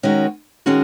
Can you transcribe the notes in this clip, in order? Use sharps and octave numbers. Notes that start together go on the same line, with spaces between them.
D#3 G#3 C#4 F#4 A#4
D#3 G#3 C#4 F#4 A#4